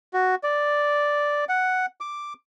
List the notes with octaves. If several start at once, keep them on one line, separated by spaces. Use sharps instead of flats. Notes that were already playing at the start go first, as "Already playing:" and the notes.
F#4
D5
F#5
D6